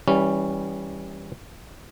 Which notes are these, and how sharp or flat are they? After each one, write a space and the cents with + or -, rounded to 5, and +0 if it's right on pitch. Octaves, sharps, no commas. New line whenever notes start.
E3 -25 G3 +0 C#4 +0